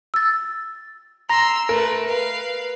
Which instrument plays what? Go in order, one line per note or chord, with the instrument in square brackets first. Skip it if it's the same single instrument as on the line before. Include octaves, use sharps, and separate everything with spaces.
[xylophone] E6 A6
[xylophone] A#5 A#6 [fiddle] C6 E6
[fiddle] A3 B4 [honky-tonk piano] A#4
[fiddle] B4 F5